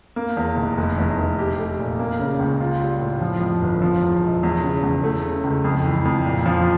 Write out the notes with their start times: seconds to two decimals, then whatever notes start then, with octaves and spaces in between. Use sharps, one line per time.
0.16 A#3
0.37 E2
0.57 F1
0.77 F1
0.98 E2
1.18 F1
1.39 G4
1.59 A3
1.79 A#2
1.99 A#3
2.19 C#3
2.39 C#2
2.60 F4
2.80 G3
3.01 A2
3.20 F3
3.41 F2
3.62 G1
3.82 F3
4.02 E2
4.22 E1
4.43 E2
4.63 C#3
4.83 E2
5.03 A3
5.24 C#3
5.44 C#2
5.64 F2
5.85 E3
6.05 F2
6.26 A#2
6.46 F3